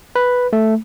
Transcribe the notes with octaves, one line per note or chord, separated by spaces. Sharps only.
B4
A3